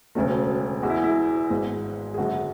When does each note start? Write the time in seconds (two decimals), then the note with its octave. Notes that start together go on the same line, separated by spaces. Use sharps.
0.15 E1 D2 C#3 F#3 A3
0.83 E2 B2 G#3 F#4
0.90 E4
1.04 E4
1.50 G#1 G#2 G#3 B3
2.14 G#4
2.18 F#1 F#2 D3 G#3 F#4